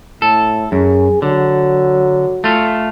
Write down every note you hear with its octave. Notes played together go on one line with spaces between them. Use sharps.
A2 A4
F#2 G#4
D3 F#3
A3 F4